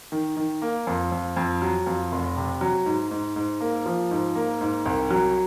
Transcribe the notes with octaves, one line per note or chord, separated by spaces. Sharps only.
D#3
D#3
A#3
F2
F2
F2
F#3
F2
F1
C3
F#3
G#2
G#2
G#2
A#3
F3
G#2
A#3
G#2
C2
F#3